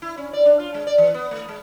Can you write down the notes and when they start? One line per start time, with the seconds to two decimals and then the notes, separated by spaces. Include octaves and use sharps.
0.02 E4
0.17 C#4
0.33 D5
0.45 D4
0.60 F4
0.74 G#3
0.87 D5
0.98 E3
1.14 B3
1.31 A3
1.49 G#3